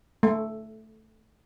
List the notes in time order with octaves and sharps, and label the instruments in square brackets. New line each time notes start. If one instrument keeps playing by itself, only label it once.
[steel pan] A3